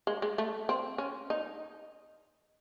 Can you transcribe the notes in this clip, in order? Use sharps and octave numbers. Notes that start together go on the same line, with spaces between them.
G#3
G#3
A3
C4
C#4
D#4